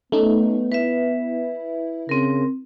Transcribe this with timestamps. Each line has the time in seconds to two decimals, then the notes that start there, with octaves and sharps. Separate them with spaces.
0.12 A3 B3 C#4 D#4
0.72 E4 B4 E5
2.09 C#3 C4 A#4